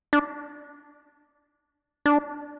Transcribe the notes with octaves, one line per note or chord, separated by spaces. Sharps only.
D4
D4